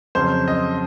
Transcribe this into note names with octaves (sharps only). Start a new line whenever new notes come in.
F2 C#3 F#3 C5
D#5